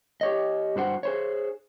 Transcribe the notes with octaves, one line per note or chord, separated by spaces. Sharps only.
G4 C#5 D#5
G2 F#4 C5 F#5
G#4 C5 C#5